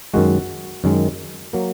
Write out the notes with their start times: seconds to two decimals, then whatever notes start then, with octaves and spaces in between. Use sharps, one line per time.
0.14 F#2 D#3 G#3 F#4
0.84 F#2 D#3 G#3
1.53 F#3 A#3